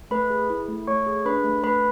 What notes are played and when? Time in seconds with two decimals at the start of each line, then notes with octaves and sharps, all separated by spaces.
0.11 A3 B4 B5
0.30 G#4
0.50 E4
0.68 A3
0.87 A3 C#5 C#6
1.07 G#4
1.26 D4 B4 B5
1.44 A3
1.64 A3 B4 B5